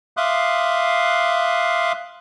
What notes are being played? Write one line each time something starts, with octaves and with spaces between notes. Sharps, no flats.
E5 F5 C6 D6 D#6 F#6